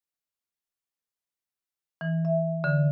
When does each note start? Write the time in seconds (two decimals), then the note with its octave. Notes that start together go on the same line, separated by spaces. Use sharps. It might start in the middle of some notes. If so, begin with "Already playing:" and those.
2.01 E3
2.25 E5
2.64 D3